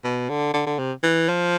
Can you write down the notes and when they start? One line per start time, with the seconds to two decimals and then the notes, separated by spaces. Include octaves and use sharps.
0.04 B2
0.29 D3
0.54 D3
0.66 D3
0.79 C3
1.03 E3
1.29 F3